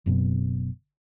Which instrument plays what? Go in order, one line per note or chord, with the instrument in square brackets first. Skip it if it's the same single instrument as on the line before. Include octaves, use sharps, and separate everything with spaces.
[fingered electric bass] F#1 F#2 B2